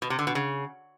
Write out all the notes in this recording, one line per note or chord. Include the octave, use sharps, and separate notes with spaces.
B2
C3
D3
B2
C#3